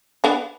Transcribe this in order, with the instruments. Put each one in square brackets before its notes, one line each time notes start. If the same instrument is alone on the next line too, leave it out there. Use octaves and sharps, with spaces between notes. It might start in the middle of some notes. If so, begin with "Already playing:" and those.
[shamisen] B3 D4